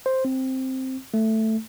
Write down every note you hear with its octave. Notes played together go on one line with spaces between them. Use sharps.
C5
C4
A3